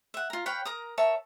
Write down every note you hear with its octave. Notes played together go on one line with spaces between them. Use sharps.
E5 F#5
F4 A#5
B4 C#5 F5 G5
A#4 A#5 D#6
A#4 C#5 E5 A5